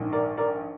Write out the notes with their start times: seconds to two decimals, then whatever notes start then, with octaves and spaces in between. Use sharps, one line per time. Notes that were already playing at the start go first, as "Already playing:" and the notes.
Already playing: A#1 G#2 D#3
0.12 A#4 D5
0.37 A#4 D5